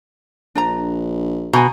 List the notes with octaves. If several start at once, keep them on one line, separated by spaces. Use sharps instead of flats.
A#1 D4 C5 A#5
B2 G#5 A#5